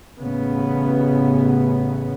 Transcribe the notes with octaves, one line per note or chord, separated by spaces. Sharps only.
A1 C#3 B3